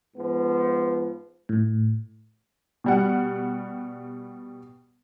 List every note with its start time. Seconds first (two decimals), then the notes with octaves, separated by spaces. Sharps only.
0.16 G#2 F3 B3
1.49 A2
2.84 B2 G3 F#5